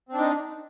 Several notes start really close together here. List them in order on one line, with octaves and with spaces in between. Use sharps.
C4 D4 D#4